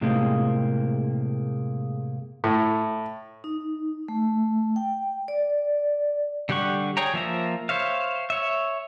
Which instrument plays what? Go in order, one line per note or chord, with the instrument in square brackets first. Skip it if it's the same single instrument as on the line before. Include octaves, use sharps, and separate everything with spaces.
[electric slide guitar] A2 C3 G#3 A#3 C4
[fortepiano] A2
[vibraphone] D#4
A3
G5
D5
[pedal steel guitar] D3 G3 G4 F#5 C#6
G#4 C#5 G5 A#5
F3 A#3 E5 A#5
C5 C#5 E5 F5
C#5 E5